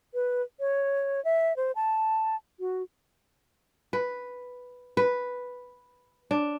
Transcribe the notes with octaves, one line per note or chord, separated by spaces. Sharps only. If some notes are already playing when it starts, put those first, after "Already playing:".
B4
C#5
E5
C5
A5
F#4
B4
B4
D4